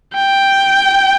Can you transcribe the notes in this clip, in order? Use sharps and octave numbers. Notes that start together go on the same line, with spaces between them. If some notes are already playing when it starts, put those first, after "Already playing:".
G5